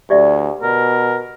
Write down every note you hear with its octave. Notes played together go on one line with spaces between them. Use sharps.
D2 G4 D5 E5
B2 A#4